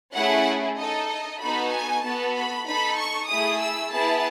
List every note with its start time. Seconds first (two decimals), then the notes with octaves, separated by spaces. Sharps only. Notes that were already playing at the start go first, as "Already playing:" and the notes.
0.15 A3 C#4 E4 G#4 F#5
0.77 D#4 A4 D#5
1.09 D#5
1.41 B3 D#4 F#4 A4 B5
1.72 G#5
2.04 B3 F#4 A4 A5
2.35 B5
2.66 D#4 A4 B5
2.98 C#6
3.29 A3 E4 G#4 D#6
3.61 E6
3.92 B3 E4 G#4 A5